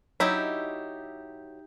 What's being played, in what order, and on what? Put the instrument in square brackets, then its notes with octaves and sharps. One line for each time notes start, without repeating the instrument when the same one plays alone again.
[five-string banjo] F#3 E4 [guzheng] D#4 G4 E5